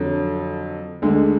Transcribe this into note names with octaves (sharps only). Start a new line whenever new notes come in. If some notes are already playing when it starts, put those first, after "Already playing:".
Already playing: F2 D3 F#3
D2 D3 G#3